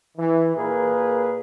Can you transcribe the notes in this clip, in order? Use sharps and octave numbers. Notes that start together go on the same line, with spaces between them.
E3
A#2 G#4 A#4 B4